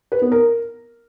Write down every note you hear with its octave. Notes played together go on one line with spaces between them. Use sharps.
B4
B3
A#4